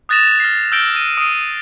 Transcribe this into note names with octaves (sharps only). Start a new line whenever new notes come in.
D#6 F#6 A6 A#6 E7 F7
F6 A#6 C7
E6 F6 G6 A#6 D7 G7
D#7
D#6 D7 D#7